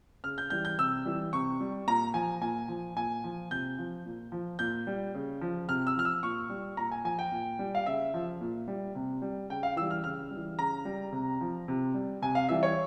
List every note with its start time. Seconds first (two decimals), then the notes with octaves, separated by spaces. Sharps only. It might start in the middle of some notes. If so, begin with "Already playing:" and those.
0.24 C#3 F6
0.38 G6
0.50 E3 G3 G6
0.65 G6
0.78 C3 E6
1.05 E3 G3
1.33 C3 C#6
1.60 G3
1.87 A#2 A#5
2.14 F3 G#5
2.41 A#2 G#5
2.68 F3
2.96 A#2 G#5
3.24 F3
3.51 C3 G6
3.78 F3
4.06 A#2
4.32 F3
4.59 A#2 G6
4.87 G3
5.15 C#3
5.41 F3
5.68 C3 F6
5.87 E6
5.96 F3 F6
6.05 E6
6.23 A#2 C#6
6.50 G3
6.77 A#2 A#5
6.92 G#5
7.04 F3 G#5
7.19 G5
7.32 A#2
7.59 G3
7.75 F5
7.86 C#3 E5
8.14 F3
8.41 A#2
8.68 G3
8.95 C3
9.22 G3
9.50 C#3 G5
9.63 F5
9.76 E3 G3 E6
9.91 F6
10.04 C#3 F6
10.31 G3
10.36 E3
10.58 C#3 A#5
10.85 G3
11.12 C3
11.41 F3
11.68 C3
11.94 G3
12.22 C3 G#5
12.35 F5
12.49 E3 G3 E5
12.63 C#5